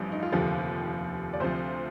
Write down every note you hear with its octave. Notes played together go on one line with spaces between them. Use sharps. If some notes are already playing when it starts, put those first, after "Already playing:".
Already playing: A1 G2 F3
D#4
F4
F1 D#2 D3 F3 G4
D5
D2 C3 F3 C5